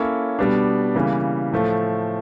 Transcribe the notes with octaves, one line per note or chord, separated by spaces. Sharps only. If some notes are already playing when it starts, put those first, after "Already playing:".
Already playing: A#3 C#4 E4 A4 C#5
B2 G3 B3 D4
C#3 E3 G3 A#3
A2 F3 A3